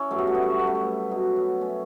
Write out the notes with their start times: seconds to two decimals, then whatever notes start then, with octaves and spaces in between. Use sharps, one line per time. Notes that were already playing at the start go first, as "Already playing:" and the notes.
Already playing: C#4 E4
0.11 G2 F#3 A3
0.18 B3
0.27 A3
0.35 B3
0.43 A3
0.51 B3
0.59 A3
0.67 B3
0.75 A3
1.11 B2 F#3 B3
1.36 B3
1.61 A3 C#4